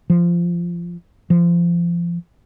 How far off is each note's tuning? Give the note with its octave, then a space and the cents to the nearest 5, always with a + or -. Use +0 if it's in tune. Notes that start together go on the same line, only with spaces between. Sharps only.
F3 -15
F3 -25